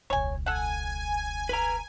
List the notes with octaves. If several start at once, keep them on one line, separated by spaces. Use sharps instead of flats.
E1 C#2 C#5 G#5
A4 F#5 G#5
B4 A#5